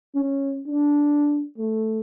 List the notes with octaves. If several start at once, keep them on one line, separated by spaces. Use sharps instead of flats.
C#4
D4
A3